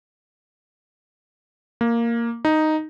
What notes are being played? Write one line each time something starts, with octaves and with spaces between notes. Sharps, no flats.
A#3
D#4